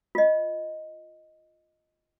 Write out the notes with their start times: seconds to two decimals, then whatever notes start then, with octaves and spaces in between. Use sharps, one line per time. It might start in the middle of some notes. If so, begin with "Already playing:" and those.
0.15 F4 D#5